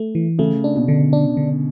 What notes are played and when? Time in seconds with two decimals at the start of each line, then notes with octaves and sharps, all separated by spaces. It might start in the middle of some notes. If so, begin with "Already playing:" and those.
Already playing: A3
0.15 E3
0.39 C#3 A3
0.64 D4
0.76 B2
0.88 D3
1.13 D4
1.37 D3